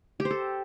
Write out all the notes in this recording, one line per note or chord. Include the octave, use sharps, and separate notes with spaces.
G4
C5
A4